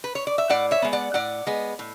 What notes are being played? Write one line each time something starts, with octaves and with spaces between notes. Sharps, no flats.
B4
C#5
D5
E5
A2 D5 F#5
C#5 E5
G#3 B3
D5 F#5
A2 D5 F#5
G#3 B3
A2